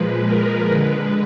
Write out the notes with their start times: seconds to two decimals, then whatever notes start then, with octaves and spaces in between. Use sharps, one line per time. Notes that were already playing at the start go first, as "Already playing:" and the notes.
Already playing: A#2 F3 G#3 B4
0.25 A#4
0.69 D3 G#3 B4